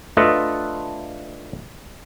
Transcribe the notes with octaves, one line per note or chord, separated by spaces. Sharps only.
A3 D4 F4 A4 B4 D#5